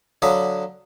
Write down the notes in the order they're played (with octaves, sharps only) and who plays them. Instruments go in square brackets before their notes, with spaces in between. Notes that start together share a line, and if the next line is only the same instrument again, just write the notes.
[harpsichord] D3 F#3 F5 B5 D#6